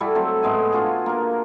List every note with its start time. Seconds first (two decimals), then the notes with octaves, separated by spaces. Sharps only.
0.01 G3 E4 F#4 A4
0.15 F#3 A3 C4 A4
0.43 A2 G#3 B3 G#5
0.72 D4 F4 F#4 G#4
1.06 A#3 A#4